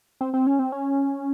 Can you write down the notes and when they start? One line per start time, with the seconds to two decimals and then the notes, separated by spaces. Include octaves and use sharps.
0.21 C4
0.34 C4
0.47 C#4
0.59 C4
0.72 C#4